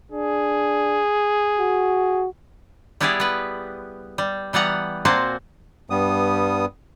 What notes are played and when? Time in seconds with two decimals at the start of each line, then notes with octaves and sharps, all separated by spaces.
0.12 D4 G#4
1.59 F#4
3.00 G3 B3 E4 G4 G#4 D5
3.20 B3 B4
4.18 G3
4.53 E3 G3 B3 F#5 A#5
5.05 A#2 A#3 C4 F#4 C5 A5
5.90 G2 G3 B3 D#6